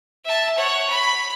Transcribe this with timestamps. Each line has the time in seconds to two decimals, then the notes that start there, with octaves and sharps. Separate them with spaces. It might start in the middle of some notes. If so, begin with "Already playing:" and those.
0.25 E5 A5
0.57 C#5 F#5
0.90 B5